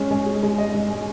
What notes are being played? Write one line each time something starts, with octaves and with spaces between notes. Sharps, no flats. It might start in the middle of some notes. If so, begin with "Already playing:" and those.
Already playing: G#3 C#4
G#3
G#4
G#3
D#5
G#3
G#3